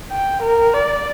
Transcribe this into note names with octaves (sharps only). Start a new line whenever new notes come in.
G5
A#4
D5